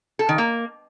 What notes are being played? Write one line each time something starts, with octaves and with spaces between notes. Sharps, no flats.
A4
D#3
A#3